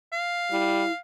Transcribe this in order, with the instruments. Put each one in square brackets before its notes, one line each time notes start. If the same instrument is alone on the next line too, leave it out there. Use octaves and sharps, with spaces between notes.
[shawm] F5
[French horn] G3 [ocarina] E4